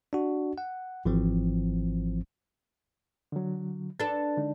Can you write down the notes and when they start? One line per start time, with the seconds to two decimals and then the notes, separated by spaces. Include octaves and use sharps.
0.13 D4 F#4
0.58 F#5
1.05 G#1 E3 F3 C4
3.32 D3 F#3
4.00 D4 A4 B4 A6
4.38 D3 G#3 D#4